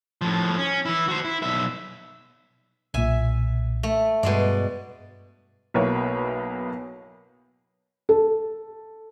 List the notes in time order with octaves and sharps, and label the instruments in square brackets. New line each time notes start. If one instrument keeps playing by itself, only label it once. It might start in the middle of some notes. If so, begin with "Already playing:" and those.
[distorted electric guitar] A2 F3
C#4
E3 E4
F#4 C5
E4
B1 E5
[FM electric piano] B1 A#2 [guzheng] E5 G#5
[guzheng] A3
[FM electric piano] G2 [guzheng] B2 G#3 D5
[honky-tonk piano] B1 B2 A#3 E4 B4 C#5
[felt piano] A4